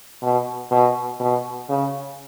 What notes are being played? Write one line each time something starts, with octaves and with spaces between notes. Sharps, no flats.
B2
B2
B2
C#3